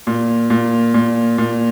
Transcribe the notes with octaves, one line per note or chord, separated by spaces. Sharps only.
A#2
A#2
A#2
A#2